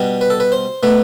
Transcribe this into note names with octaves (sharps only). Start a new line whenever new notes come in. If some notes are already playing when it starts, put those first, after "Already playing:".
Already playing: B2 G3 D4
B4
A4
B4
C5
B2 A3 D4 B4